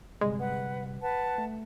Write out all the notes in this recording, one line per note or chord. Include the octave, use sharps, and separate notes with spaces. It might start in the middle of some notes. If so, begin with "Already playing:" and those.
G1 C3 G3 G#3
B4 F#5
B4 F#5 A5
A3